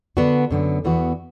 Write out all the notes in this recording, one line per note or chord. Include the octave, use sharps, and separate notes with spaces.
D3 B3 D4 F#4
F#2 D3 B3
E2 E3 B3 F#4